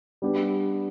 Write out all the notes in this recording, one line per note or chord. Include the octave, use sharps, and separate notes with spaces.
G3 B3 D4 G4